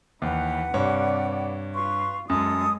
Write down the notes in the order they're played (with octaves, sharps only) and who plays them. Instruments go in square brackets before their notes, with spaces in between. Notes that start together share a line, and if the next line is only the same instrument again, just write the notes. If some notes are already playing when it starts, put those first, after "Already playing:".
[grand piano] D#2 [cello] E3 [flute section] B4 F#5
[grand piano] G2 C#5 [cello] C3 D5
[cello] F4 [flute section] B4 C6 C#6
[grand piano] F#2 [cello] G#3 [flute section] A4 D#6